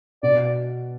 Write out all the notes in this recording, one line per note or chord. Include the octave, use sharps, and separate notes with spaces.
B2 D5